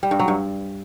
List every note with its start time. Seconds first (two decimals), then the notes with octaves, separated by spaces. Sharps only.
0.03 G3
0.11 G2
0.19 F#3
0.28 G2